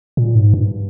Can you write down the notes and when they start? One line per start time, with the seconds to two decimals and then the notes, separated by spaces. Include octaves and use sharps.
0.17 A#2
0.35 G#2
0.54 G2